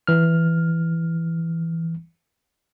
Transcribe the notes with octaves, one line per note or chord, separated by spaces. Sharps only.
E3 F6